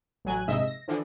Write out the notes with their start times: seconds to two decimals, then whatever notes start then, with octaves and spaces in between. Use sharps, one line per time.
0.25 A1 F#3 G#5 F#6
0.48 A#1 G#2 C3 D#5 E5 E6
0.67 A#6
0.88 D3 E3 F3